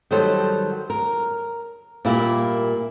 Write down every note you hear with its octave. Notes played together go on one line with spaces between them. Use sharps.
D#3 F#3 G3 A4 C5
A#4
A#2 G3 A#3 E4 G4